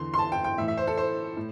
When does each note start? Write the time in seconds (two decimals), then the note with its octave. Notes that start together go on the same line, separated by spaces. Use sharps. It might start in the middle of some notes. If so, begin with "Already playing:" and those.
Already playing: E2 D3 C6
0.14 C6
0.19 A5
0.32 G5
0.44 G5
0.58 A2 E5
0.61 E3
0.68 E5
0.77 C5
0.87 A4
0.97 C5
1.37 A2